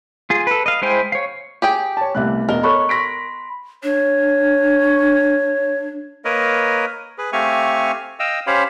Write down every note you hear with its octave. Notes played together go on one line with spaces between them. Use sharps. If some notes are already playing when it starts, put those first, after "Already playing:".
F4 G#4
A4 B4
D#5 F5
G#3 E4 C5 G5 G#5
C#5 F5
G4 G#4 G5
C#5 A5
C2 A3 B3 E5 F#6
E1 B2 A#4 D#5 G7
A4 C#5 B5 C#6 F#6
B5 C6 A#6 B6 D7
D4 C#5
A#3 A#4 B4 C#5 D#5
G#4 B4
A3 C4 G4 F5 G#5 C#6
D#5 F5 G5 E6
C#4 G4 C5 C#5 F5 B5